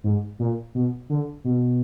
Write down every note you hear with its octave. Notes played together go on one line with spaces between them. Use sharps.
G#2
A#2
B2
D3
B2